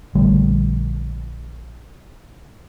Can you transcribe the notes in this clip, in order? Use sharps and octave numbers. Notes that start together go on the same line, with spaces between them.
A#1 D3 G3 A3